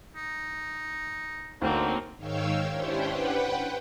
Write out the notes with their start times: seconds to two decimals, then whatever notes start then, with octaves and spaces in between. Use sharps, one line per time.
0.16 D#4
1.62 D2 F#3 A#3 C4 D4 D#4
2.17 G#2 D#3 C#5 F5 G5 E6
2.71 C#4 D4 E4 G4 C5
3.02 B4 F#5 G5